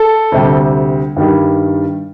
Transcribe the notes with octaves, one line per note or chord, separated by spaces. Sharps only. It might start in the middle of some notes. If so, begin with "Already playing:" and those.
Already playing: A4
D2 C3 G3
G2 D#3 G3